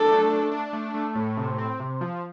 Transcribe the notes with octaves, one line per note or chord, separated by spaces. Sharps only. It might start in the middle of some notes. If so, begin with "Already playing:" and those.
Already playing: D4 A4
A3
D4
D4
A3
A3
A2
C3
C4
C3
F3